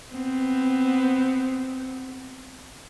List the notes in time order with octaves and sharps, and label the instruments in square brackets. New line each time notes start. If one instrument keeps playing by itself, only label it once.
[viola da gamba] B3 C4